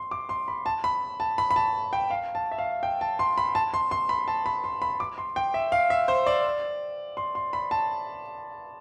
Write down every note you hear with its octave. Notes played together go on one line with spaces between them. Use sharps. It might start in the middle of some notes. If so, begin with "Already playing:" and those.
Already playing: C6
D6
C6
B5
A5
B5
A5
B5
B5
A5
G5
F5
A5
E5
F5
G5
A5
C6
B5
A5
C6
C6
B5
A5
B5
C6
B5
D6
C6
G5
E5
F5
E5
C5
D5
C6
C6
B5
A5